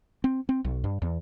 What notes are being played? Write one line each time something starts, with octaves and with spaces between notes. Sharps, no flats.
C4
C4
B1
G2
E2